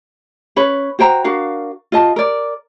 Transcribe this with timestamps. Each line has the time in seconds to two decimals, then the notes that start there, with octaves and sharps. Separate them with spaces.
0.56 C#4 B4 C#5
0.99 F#4 C5 G5 A#5
1.24 D4 F#4 A#4 F5
1.92 F4 D#5 A5
2.16 A#4 D5